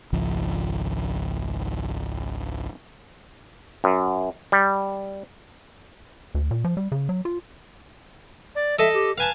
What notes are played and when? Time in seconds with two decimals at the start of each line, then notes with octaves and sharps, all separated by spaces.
0.13 G#1 C#2 F3
3.84 F#2
4.52 G3
6.35 D2
6.51 A#2
6.64 F3
6.77 G3
6.92 C#3
7.09 F#3
7.25 F4
8.55 D5
8.79 A4 D#5 E5 A5
8.94 G4
9.18 B4 F5 G#5 A5